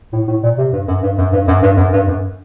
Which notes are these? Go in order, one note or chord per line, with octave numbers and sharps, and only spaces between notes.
A2
A2
A#2
C3
G2
F#2
G2
F#2
G2
F#2
G2
F#2
G2
F#2